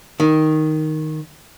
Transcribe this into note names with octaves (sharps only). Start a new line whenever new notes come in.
D#3